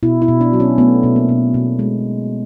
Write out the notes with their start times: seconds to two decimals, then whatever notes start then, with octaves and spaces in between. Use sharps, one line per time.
0.03 B2 E4
0.22 E4
0.28 B2
0.41 D4
0.53 F#3
0.60 C#4
0.78 A3 B3
1.03 B2
1.16 A#3
1.29 B2
1.54 B2
1.79 G#3